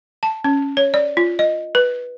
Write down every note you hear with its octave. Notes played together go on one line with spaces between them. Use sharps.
A5
C#4
C#5
D5
F4
D#5
B4